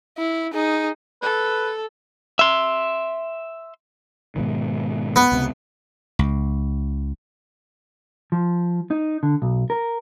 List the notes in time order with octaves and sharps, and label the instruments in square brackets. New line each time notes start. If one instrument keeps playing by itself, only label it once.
[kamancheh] E4
D#4 G#4
[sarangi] A4 [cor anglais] B4
[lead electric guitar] E5 C6
[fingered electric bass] G#2 B2 D#3
[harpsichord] B3
[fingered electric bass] C#2 C3
[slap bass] C#2
[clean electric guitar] F3
D#4
D3
B1
A#4